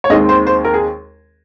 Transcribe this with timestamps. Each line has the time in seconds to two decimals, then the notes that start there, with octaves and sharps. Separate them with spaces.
0.04 C#5
0.10 D#2 D#3 G#3 C4 D#5
0.29 C5
0.47 C5
0.65 A#4
0.74 G#4